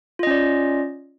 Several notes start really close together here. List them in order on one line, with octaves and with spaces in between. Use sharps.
F4 D#5 C#4 D5